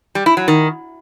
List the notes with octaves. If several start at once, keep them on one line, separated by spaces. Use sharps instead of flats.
G3
E4
F#3
D#3